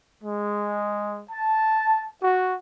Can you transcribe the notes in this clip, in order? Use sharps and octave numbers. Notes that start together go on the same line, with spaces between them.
G#3
A5
F#4